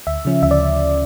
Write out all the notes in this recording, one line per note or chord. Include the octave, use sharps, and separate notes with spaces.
D2 E5
C#3 F3 C#4
D2 E5
D5